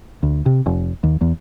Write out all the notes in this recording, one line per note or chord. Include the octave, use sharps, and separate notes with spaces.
D2
C3
F1
D#2
E2